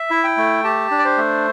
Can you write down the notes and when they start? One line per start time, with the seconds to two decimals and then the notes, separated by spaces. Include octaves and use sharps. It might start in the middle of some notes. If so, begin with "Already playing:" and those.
Already playing: E5
0.10 E4
0.24 G5
0.37 A3
0.64 G4 A5
0.91 D4
0.99 D5
1.05 C5
1.18 A3